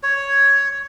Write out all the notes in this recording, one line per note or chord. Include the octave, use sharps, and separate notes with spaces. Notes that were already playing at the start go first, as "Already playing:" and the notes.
C#5